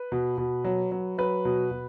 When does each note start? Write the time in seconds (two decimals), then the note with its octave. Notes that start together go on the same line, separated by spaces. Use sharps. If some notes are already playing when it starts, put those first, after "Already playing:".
Already playing: B4
0.12 B2
0.38 B2
0.64 F#3
0.92 F#3
1.18 F#3 B4
1.45 B2
1.71 B2